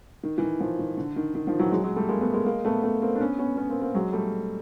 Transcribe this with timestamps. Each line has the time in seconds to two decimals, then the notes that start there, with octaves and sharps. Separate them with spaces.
0.23 D#3
0.38 E3
0.42 D#3
0.60 D#3 F3
0.79 D#3
0.97 D3
1.16 D#3
1.35 D#3
1.47 D#3 F3
1.59 E3 F#3
1.72 F#3 G#3
1.83 F#3 G#3
1.96 G3 A3
2.08 G#3 A#3
2.21 A3 B3
2.33 G#3 A#3
2.46 G#3 A#3
2.65 A3 B3
2.83 A3 B3
3.02 A#3 C4
3.15 D4
3.20 B3 C#4
3.38 B3 C#4
3.57 B3 C#4
3.69 A#3 C4
3.81 A#3 C4
3.95 F#3 G#3
4.13 G3 A3